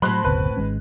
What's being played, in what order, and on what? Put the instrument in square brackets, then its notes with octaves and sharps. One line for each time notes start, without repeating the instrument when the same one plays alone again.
[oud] A2 C4 [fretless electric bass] F#3 [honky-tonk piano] B5 C6 F#6
[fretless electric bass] F#1 D2 B2 [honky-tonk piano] B4
[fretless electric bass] G#1 G#3 C#4